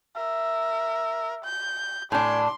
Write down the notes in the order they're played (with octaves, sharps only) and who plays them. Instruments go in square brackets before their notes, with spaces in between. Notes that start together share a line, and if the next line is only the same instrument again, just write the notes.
[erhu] A#4 [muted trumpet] E5
[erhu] G6
[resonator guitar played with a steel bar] A2 D4 [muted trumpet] G#5 [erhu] C6